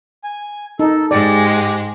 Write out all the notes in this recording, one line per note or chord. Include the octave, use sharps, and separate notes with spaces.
G#5
D#4 A4
G#2 G#3 G4 D5